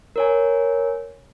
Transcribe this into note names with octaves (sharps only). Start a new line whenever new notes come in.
A#4 C#5 G#5